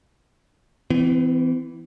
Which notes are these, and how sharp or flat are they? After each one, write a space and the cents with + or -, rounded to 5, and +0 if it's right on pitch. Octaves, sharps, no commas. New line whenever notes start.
E3 +0 C4 -45